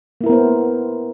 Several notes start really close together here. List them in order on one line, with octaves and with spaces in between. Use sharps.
A#3 E4 A#4 B3 C5